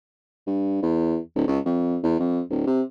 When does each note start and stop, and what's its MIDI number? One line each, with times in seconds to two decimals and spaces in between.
0.47 0.79 43
0.82 1.18 40
1.36 1.47 26
1.48 1.59 37
1.66 1.97 41
2.03 2.18 40
2.19 2.41 41
2.50 2.62 26
2.67 2.82 48